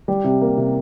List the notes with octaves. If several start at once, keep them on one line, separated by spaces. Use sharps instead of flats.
G3
C3
A#3
C3